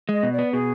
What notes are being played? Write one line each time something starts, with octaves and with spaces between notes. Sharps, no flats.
G#3 D#5
B2
D5
B3
B2 G#4